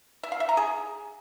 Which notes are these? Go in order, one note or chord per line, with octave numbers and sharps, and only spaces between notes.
E5
F5
E5
A#5
G#4